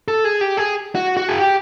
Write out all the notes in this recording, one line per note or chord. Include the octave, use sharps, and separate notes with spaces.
A4
G#4
G4
G#4
F#4
F#4
G#4
G4